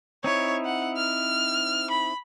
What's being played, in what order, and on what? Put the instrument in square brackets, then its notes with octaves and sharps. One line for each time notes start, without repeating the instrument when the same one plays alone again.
[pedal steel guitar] C4 D#4 E4 [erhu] C#5
[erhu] F#5
F6
B5